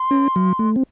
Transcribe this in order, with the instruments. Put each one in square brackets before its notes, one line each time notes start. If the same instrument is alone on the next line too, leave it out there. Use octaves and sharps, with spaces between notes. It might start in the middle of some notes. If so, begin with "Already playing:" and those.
Already playing: [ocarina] C6
[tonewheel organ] C#4
F#3
A3
C4